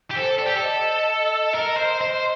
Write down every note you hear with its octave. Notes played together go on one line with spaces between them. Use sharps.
G4
A4 C5
A4 D5
G4
A4
D#5
A#4
C5
C5